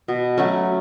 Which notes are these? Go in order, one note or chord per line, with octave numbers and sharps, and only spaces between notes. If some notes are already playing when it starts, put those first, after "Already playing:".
B2
F#3 A3 C#4